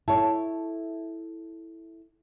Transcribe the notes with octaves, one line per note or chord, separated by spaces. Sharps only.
E4 A4 C#5 A5